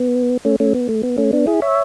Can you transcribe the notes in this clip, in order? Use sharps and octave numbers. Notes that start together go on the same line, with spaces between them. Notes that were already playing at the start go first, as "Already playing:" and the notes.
Already playing: B3
A3 C#4
A3 C#4
B3
A3
B3
A3 C#4
B3 D4
E4 G#4
C#5 E5